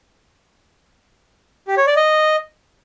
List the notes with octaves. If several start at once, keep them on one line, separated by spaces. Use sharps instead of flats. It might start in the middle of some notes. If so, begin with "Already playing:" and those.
G4
C#5
D5
D#5